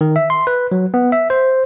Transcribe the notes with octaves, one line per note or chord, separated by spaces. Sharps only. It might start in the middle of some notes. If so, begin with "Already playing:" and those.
D#3
E5
C6
B4
F#3
B3
E5
C5